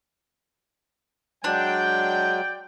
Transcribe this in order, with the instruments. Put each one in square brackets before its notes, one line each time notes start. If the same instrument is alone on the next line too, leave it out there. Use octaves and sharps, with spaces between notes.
[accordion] F#3 G#3 [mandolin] D4 [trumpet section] D5 G5